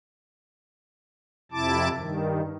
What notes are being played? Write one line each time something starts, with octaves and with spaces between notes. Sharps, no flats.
F2 C3 E4 A5 D6
G2 D#3